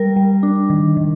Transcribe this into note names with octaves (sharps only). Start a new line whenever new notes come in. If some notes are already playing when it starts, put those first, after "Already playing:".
Already playing: G3 A#4
G3
D4
D#3
D#3